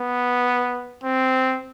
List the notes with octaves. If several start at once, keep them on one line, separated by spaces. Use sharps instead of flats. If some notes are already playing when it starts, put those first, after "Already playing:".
Already playing: B3
C4